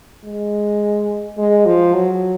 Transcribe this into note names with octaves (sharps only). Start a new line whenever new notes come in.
G#3
G#3
F3
F#3